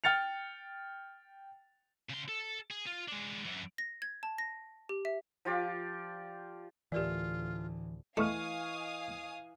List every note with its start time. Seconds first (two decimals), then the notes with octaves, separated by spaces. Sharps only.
0.04 G5 F6 A6 C#7 F7
2.10 C#3 C6
2.29 A4
2.71 G#4
2.87 F4
3.09 G#3 D4
3.45 F#2 E3
3.78 A#6
4.02 G#6
4.23 A5
4.38 A#6
4.89 G4
5.05 E5
5.45 F3 F4 G4 D5
6.92 D2 A2 E3 F4 G4 A#4 D5
8.17 E3 A3 D#5 F5 G#5 C#6 D#6 F6